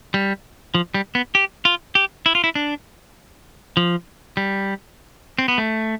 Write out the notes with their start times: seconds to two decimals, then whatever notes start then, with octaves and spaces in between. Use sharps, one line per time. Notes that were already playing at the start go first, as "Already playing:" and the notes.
0.14 G3
0.75 F3
0.94 G3
1.15 B3
1.35 G4
1.65 F4
1.95 G4
2.26 E4
2.35 F4
2.44 E4
2.55 D4
3.77 F3
4.37 G3
5.39 C4
5.48 B3
5.58 A3